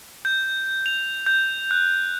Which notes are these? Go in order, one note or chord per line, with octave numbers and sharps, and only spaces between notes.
G6
F7
G6
F#6